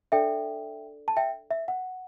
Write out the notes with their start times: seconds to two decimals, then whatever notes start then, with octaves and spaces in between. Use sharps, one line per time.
0.12 D4 A4 D5 E5 G5
1.08 A5
1.17 E5 G5
1.51 E5
1.68 F#5